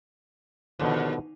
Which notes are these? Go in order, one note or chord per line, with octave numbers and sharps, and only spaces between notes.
D#2 B2 D3 F3